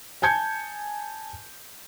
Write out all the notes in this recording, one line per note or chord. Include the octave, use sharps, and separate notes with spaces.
G#5 A5 G6 G#6 C#7